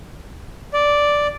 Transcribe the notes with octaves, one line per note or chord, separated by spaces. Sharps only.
D5